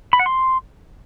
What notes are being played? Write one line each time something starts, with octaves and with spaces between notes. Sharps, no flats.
B5
F#5
C6